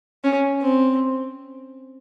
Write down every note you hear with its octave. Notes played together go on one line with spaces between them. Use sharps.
C#4
C4